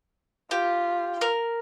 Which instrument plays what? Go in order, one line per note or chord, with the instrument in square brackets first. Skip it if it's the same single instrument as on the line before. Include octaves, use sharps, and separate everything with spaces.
[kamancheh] F4 [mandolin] G4
[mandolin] A#4 F6